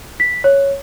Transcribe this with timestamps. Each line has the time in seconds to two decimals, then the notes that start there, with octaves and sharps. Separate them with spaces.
0.20 B6
0.44 C#5